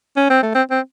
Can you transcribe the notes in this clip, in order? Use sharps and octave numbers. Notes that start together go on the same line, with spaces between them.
C#4
C4
A3
C4
C4